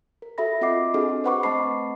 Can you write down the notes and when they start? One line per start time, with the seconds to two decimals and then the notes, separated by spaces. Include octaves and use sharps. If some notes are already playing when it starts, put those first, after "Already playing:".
0.22 A#4
0.38 F#4 A4 E5 B5 A#6
0.61 C4 F4 D#5 F#5 D6 C7
0.94 C4 D4 F#4 G#4 A4 D#5
1.24 B4 C5 F#5 B5 C#6 D6
1.43 A3 C4 D#5 A5 B5 C7